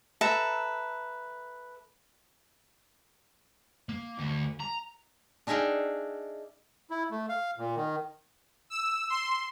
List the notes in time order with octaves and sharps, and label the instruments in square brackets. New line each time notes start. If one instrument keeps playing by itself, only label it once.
[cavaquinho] A4 B4 E5 A#5
[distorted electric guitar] A#3
D2
A#5
[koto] D4 D#4 G#4 E5 F5 G5
[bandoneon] E4
A3
F5
A#2
D#3
[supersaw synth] E6
C6